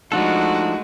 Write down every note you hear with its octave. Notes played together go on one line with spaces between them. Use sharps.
F3 G#3 A3 D4 D#4 F#4 A4